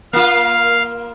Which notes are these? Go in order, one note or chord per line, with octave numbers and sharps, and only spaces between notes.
A#3 F4 F5